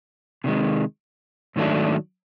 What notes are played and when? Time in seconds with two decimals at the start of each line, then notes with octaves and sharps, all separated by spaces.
0.44 C3 D#3 G#3
1.56 G#2 D#3 F#3 A3 D4